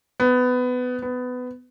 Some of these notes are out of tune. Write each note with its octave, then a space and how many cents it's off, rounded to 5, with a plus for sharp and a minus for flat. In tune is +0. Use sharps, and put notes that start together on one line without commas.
B3 +20
B3 +20